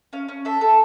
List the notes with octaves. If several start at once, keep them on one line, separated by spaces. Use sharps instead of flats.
C#4 F5
C#4
A4 E5
A4